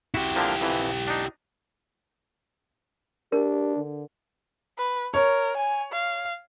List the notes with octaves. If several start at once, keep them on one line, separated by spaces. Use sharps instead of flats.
E4 F#4 G4
D3 F3 A#3
F2 E3
D4 D#4
D4 G4 A#4
D3
B4
A#4 C#5
G#5
F5